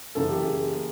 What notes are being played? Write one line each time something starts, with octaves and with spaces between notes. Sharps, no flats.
F#2 C#3 E3 A4
G4
G#4